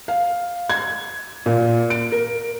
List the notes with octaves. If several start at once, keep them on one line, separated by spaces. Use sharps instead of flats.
F5
G#6
A#2
D7
A#4